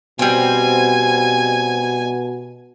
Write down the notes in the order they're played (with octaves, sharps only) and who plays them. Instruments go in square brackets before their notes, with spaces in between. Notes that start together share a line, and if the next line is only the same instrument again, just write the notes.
[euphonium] B2 [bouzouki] G3 C4 [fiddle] G#5